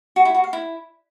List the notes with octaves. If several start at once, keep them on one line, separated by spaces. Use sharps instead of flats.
F#4
E4
F#4
F5
E4